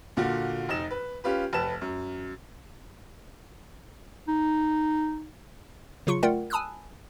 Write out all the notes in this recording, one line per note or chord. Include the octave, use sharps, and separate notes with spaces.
A#2 D3 F4 F#4
F1 D#4 E7
B4
C#4 F4 G4 B4
F1 B4 A5 E7
F#2
D#4
C#3 F#3 F4 C#6 C#7
A3 F4 A#4 D5 F#5 G5
G#5 A5 B5 D#6 E6 F#6